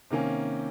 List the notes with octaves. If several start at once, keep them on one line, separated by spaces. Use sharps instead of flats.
C3 D#3 A#3 C#4